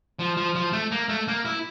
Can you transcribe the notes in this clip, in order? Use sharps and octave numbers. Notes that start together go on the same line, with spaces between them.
F3
F3
F3
A3
A#3
A3
A#3
E4